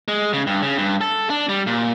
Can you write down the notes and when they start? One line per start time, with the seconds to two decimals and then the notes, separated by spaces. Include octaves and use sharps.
0.08 G#3
0.33 C#3
0.47 G2
0.62 C#3
0.78 G2
1.01 A4
1.30 D4
1.49 G3
1.67 A#2